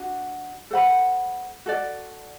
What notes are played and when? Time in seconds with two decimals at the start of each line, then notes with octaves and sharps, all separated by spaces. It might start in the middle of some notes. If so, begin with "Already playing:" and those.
Already playing: D4 F#4
0.71 A4 C5 F#5 B5
1.66 F#4 A4 D5